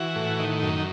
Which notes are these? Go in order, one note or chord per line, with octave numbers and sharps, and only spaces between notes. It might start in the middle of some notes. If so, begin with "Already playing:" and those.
Already playing: E3 F#4
A2
D#3
F#2